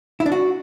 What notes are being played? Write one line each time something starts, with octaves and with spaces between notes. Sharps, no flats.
E4
D4
F#4